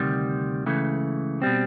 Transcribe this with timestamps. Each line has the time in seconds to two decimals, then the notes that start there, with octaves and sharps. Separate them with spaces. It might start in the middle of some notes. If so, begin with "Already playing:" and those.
Already playing: D2 C3 D#3 G3
0.66 C#2 C#3 E3 A3
1.42 B2 G3 C4